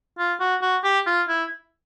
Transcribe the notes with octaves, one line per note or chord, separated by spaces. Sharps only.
F4
F#4
F#4
G4
F4
E4